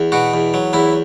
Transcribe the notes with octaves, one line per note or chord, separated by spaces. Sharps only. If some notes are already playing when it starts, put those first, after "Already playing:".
Already playing: E2
B2 F#4
E2
F#3
E2 E4